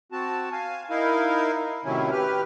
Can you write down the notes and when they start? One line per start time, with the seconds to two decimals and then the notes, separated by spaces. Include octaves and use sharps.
0.12 C4 F#4 A5
0.52 F5 G#5
0.90 D#4 E4 A#4 F5
1.85 A2 C3 D#3 F#3 C#4 E4
2.12 G4 B4 F6